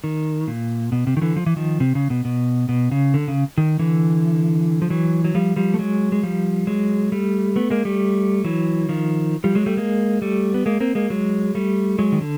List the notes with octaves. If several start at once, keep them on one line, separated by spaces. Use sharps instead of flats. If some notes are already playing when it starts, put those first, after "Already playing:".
D#3
A#2
B2
C3
D#3
D3 E3
F3
E3
D#3 F3
C3
C#3
B2
B2
B2
C#3
D3
C#3
D#3
D3 E3
F3
E3 F#3
F#3
F3 G3
F3 G3
A3
F#3 G#3
G#3
F3 G3
F#3 G#3
G3 A3
A3 B3
G#3 A#3
G3 A3
E3 F#3
D#3 F3
F3 G3
F#3 G#3
G3 A3
G#3 A#3
G3 A3
B3
G#3 A#3
A#3 C4
G#3 A#3
F#3 G#3
G3 A3
F#3 G#3
D#3
D3